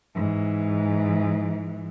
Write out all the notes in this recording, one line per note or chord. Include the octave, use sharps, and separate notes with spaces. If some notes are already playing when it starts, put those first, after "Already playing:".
G#2 E3